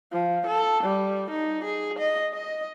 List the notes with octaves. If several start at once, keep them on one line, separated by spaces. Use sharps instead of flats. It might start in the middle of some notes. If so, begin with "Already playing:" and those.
F3
A4
G3
D#4
G#4
D#5
D#5